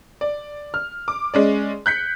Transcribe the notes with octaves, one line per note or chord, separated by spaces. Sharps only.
D5
F6
D6
G#3 C#4 D5
F#6 G6 B6 C#7